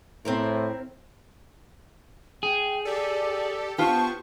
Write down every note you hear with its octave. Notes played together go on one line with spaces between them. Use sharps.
A2 C4 E4 A#4
G#4 G5
G4 A4 D5
B3 F4 G4 C5 A5 C#6